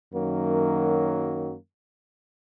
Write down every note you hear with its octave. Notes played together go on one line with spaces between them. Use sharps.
F#2 D#3 F#3 A#3